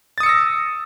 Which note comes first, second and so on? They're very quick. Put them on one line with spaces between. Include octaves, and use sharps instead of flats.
A6 D#6 C#7 E6 A#6